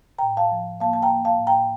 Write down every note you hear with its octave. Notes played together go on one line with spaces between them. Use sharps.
G5 A#5
A2
F5 A5
F3
A#3 F5 A5
A5
G5 A#5
A#3
F5 A5
A2
G5 A#5